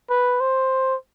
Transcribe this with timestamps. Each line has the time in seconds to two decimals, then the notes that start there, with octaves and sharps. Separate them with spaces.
0.10 B4
0.40 C5